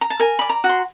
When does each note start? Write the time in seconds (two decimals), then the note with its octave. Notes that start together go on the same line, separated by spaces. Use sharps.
0.01 A#5
0.10 A5
0.20 A#4 G#5
0.39 D5 B5
0.49 A#5
0.64 F#4
0.69 C6